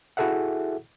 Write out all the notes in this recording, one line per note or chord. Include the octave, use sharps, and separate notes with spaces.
E4 F#4 G#4 A4 E5 F#5